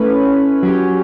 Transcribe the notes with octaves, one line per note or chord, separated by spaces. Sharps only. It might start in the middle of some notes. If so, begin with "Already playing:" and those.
Already playing: A3 C#4 E4 B4
F#3 C#4 G4